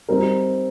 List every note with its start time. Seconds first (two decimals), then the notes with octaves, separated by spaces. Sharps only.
0.09 G3 C4 D#4 A#4